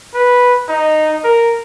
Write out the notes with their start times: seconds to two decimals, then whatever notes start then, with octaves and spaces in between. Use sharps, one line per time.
0.15 B4
0.68 D#4
1.24 A#4